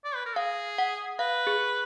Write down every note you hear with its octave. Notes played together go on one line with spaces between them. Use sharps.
D5
B4
A#4
G#4 F5
F#5
B4 F5
G#4